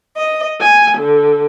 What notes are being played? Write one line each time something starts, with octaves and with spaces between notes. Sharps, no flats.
D#5
G#5
D3